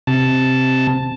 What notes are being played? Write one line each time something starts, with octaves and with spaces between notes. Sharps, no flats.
C3 A5